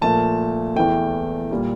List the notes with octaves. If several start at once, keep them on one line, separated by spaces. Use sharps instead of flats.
A#2 F3 A3 A5
E2 E3 A3 G5
A#2 G3 A#3